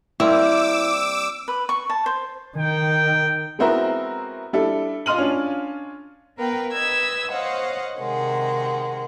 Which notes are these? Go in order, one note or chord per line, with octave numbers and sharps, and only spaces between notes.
G3 A#3 C4 E4 D6 E6
B4
C#6
A5
C5
D#3 G5
G#3 B3 C4 E4 F#4 A#4
G3 D4 E4 A4
F4 D#5 C6 F6 D#7 F#7
C#4 D4 F4
B3 A#4 B4 F5 G5
B4 D#5 E6 G#6
C5 C#5 D#5 F5 F#5
C3 D#3 G#3 F#5